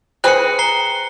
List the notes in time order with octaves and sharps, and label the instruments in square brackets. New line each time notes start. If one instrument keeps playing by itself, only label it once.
[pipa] C4 G#4 B4 [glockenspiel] F#6 C#7
[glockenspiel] A#5 C7 G7